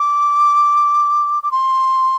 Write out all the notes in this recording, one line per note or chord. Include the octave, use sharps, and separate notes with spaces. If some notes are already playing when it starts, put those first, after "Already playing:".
Already playing: D6
D6
C6